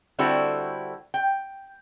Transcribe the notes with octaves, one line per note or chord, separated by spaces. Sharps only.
D3 G3 C4 E4 F#4 A4
G5